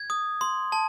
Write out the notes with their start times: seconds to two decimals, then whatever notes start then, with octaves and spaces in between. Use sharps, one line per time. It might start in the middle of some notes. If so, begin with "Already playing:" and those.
Already playing: G#6
0.10 D#6
0.41 C6
0.72 A5